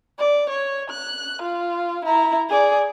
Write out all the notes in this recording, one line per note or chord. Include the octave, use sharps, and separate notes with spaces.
D5
C#5
F#6
F4
E4 A#5
G#4 D5